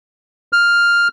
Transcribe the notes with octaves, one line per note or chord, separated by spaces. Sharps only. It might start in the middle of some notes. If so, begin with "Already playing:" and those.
F6